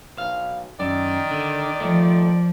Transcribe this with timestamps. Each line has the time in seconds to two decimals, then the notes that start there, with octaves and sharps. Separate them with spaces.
0.18 B1 F5
0.80 F#2 D#3 D5
1.31 D3
1.80 F3 A3